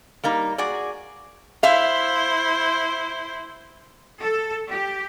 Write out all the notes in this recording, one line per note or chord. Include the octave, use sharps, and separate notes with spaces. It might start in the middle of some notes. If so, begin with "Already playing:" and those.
G3 A#3 D#4
F#4 G#4 D5
E4 C5 E5 F5
A4
G4